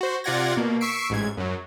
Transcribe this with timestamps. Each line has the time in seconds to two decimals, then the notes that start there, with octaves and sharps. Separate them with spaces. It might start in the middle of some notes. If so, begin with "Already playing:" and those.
0.01 F#4 C5
0.24 C3 F4 D5 F#5 G#6 A#6
0.57 B2 A#3
0.81 C#6 E6 B6 C7 D7
1.10 A1 G#2 G#6
1.37 F#2 F#3